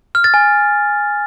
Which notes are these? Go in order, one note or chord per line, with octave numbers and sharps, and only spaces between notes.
F6
A6
G#5